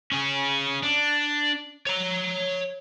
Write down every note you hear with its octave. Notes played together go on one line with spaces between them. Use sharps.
C#4 G#4
D4
C#5 A#5